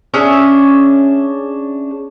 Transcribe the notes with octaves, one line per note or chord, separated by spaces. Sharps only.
C#4 D4 G#4 E5